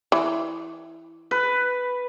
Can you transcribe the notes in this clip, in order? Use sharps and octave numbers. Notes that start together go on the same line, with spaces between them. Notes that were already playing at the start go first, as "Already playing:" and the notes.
E3
B4